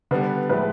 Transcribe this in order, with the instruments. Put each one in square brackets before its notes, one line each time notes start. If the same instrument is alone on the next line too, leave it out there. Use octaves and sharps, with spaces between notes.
[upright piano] D3 G3 B3 [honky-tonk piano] B4
[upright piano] A2 F3 G#3 [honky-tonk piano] B4